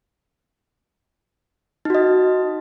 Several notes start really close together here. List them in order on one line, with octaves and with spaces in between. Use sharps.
D#4 F#4 D#5